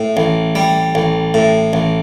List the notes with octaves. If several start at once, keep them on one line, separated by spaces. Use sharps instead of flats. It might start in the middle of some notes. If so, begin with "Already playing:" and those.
Already playing: A2
A1
G3
A1
A2
A1